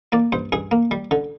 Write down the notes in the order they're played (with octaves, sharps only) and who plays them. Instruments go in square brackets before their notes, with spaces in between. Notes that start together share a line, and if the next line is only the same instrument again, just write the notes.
[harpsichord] A#3 D5
G2 C5
G2 G#4
A#3
G3
D3